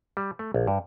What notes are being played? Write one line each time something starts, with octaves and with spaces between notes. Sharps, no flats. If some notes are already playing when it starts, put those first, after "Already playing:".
G3
A3
A#1
G2